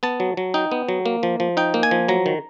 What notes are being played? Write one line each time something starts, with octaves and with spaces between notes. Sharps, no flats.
B3 A5
F#3
F#3
D#4 G5
B3
F#3
A#3
F3
F3
D#4 G5
A#3
G#5
F3
F#3 A#5
D#3